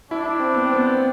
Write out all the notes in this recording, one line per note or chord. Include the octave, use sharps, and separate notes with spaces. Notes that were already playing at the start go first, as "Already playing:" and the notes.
D4 E4
E4
C4
B3
C4
B3
C4